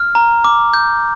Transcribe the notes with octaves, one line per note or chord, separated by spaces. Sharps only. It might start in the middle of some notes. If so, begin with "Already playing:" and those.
Already playing: F6
A#5
D6
G6